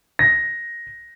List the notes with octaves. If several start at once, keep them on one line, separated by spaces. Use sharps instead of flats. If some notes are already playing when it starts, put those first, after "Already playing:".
A#6